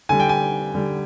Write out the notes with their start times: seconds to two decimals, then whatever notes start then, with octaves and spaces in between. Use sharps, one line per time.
0.09 D3 G3 G#5
0.20 G5
0.29 G#5
0.74 D3 G3